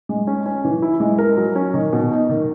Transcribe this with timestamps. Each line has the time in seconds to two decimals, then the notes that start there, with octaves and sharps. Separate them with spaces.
0.09 G#3
0.27 C#4
0.46 C#4
0.65 E3
0.82 E4
1.00 G#3
1.18 A#4
1.37 F#3
1.56 C#4
1.74 D#3
1.93 B2
2.11 D#4
2.29 D#3